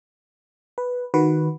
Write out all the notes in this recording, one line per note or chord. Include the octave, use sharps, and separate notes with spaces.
B4
D#3 F#4 B4